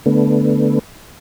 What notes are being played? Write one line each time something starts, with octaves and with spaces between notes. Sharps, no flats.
D3 A3 B3